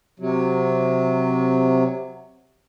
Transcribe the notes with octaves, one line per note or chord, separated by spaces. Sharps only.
C3 F#3